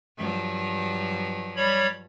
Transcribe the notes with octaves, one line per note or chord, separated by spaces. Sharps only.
G2 F3 F#3
G3 C#5 B5